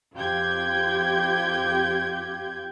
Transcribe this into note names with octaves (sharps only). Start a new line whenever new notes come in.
F2 F4 G4 G5 G6 G#6